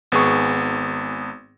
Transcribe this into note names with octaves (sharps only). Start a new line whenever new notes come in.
G#1 B3 G#4 C#6